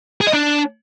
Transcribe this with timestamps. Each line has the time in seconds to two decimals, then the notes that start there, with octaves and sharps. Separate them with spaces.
0.21 G#4
0.27 D#5
0.33 D4